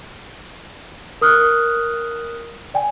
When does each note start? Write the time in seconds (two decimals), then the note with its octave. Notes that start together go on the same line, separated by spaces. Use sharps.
1.21 A#4 D#6 F6 F#6
2.74 D5 G5 G#5